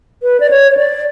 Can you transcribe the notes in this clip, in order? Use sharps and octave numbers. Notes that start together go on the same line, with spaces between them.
B4
D5
C#5
C#5
D5